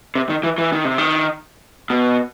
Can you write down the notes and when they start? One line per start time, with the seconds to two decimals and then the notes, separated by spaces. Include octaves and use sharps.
0.15 C3
0.29 D#3
0.43 E3
0.58 E3
0.73 D#3
0.85 C3
0.98 D#3
1.90 B2